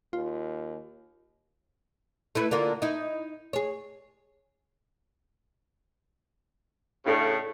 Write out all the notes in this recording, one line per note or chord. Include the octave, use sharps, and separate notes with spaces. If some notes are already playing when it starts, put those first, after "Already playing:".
D#2 F4
A3 E4 B4
D3 A#3 F4
D#4 E4
G#4 C#5
A2 C#3 D4 A4